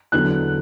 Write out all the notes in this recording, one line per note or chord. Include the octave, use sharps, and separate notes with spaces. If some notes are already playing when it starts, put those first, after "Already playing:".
E2 D3 F#3 B3 F#6